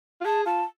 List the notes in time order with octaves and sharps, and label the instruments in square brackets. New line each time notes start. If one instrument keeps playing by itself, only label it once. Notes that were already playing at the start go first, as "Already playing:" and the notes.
[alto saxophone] F4
[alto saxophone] G#4 [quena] A5
[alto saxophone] F4 [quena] A5